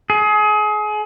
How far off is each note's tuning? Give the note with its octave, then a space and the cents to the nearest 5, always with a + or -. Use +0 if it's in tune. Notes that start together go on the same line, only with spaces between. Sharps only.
G#4 +30